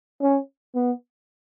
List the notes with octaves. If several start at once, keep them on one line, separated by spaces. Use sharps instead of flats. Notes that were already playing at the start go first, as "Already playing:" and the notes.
C#4
B3